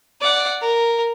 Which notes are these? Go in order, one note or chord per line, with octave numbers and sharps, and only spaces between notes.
D5 F#5
A#4